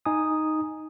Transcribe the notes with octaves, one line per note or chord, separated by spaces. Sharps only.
D#4 G#5 D#6